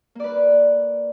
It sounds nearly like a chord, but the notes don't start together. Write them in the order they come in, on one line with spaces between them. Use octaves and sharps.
A#3 D5 B4